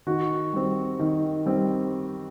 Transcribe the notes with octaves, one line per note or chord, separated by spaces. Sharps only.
D#3 F#4
G3 C4
D#3
G3 C4